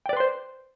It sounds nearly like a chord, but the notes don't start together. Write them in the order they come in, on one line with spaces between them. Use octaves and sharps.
G5 D5 B4 C6 C5